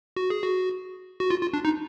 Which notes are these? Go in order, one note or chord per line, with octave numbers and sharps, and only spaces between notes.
F#4
G#4
F#4
F#4
F4
F4
D4
D#4